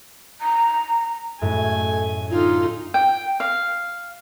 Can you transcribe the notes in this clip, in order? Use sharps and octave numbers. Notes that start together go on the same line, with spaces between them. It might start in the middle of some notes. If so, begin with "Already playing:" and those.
A#5
F#2 A2 G#3 A3 G#5
D3 D#4 F4
G5
F5